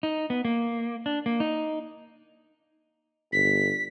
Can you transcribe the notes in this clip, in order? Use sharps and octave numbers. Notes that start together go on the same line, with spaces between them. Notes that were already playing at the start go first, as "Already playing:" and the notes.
D#4
B3
A#3
D4
A#3
D#4
G1 B6